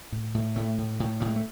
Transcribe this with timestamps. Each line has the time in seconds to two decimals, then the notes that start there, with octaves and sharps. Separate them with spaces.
0.12 A2
0.35 A2
0.56 A2 A3
0.78 A2
1.00 A2
1.20 A2 G3
1.27 G#3
1.36 A3